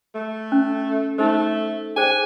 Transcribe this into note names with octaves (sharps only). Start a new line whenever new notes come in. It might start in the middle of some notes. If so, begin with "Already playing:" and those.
A3
C#4
A3 D#4 C5
G#4 C5 G5 G#5